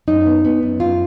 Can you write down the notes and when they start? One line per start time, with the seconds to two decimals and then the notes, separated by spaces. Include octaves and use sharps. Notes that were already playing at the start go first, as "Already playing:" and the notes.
0.08 F#2 D#4
0.26 B3
0.45 B3
0.63 F#2
0.80 F#2 F4